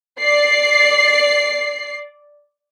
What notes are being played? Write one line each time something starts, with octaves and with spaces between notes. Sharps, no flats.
D5 C7